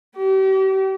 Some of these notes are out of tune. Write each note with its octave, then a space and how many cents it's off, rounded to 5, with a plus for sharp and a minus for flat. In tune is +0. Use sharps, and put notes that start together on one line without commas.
G4 -40